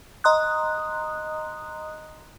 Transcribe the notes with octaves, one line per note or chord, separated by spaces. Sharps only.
D#5 A#5 C6 D#6 F#6